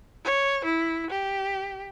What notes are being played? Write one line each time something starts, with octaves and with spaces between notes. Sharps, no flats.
C#5
E4
G4